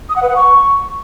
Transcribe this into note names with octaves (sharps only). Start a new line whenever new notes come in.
D#6
F#5
B4
F#5
C#6